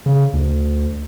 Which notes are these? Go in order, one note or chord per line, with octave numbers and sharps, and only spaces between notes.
C#3
D2